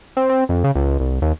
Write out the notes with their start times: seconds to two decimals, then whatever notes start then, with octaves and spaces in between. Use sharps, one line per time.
0.17 C4
0.29 C4
0.49 F2
0.64 C#3
0.75 C#2
1.00 C2
1.22 D#2